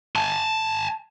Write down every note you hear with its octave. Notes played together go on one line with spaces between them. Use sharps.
G#5 A5